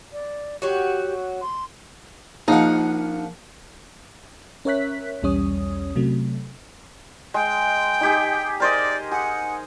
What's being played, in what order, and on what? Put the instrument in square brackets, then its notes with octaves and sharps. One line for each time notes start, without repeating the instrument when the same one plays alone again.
[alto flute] D5
[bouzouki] F#3 F#4 [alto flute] G4
[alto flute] C6
[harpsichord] A#1 F3 F#5 [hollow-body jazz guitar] D#4
[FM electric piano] C#4 A#4 C#5 E5 F#6 B6
B1 E2 G3 C#4 C#5 D#6
C3 F#3 A3
[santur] G#3 [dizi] G5
[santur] D#4 G4 G#4
[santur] A#4 C5 D#5 [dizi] D5
[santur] G#4 [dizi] F#5